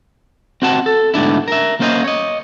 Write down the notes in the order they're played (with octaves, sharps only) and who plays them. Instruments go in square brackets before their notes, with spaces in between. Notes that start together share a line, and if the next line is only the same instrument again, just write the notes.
[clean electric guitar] C4 F#4 F#5 A5
A4
D2 G#2 B3 D4 E4
A#4 E5
A#3 C#4 C5 D#5
C#5 D#5